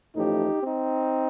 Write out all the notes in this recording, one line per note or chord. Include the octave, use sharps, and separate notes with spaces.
A1 A2 F3 D#4 G4
C4 D#4